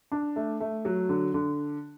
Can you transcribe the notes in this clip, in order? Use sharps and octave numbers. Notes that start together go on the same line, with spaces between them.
D4
A3
A3
F#3
D3
D3